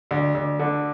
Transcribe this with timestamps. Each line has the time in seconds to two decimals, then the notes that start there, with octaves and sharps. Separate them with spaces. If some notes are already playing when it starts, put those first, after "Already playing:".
0.11 D2
0.35 D2
0.59 D3